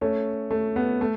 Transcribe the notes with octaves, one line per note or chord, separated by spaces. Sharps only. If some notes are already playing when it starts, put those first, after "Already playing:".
A3 C#4
A3
B3
A3